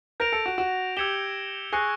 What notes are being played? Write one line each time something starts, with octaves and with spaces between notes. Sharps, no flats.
A#4 G6 A#6 D7 F7
A4
F#4
F#4
G4 E6 G#6 C#7 E7 G7
G#4 C#6 F#6 A#6 C#7